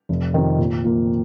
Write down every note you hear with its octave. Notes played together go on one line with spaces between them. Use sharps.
F1
F2 C3 D#3
A#2
F3 A#3